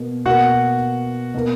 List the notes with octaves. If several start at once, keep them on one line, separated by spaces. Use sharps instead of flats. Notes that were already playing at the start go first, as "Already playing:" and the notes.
Already playing: B2 A#3
B2 A#3 F#4 F#5
B2 A#3